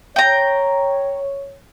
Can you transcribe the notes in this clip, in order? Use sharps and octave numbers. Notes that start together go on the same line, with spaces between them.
C#5 G5 A#5